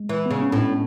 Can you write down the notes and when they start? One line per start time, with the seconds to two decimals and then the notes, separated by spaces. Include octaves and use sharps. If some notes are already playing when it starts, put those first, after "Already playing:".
Already playing: G#3
0.09 E3
0.26 C#3 B3
0.42 C#4
0.52 A2
0.58 D4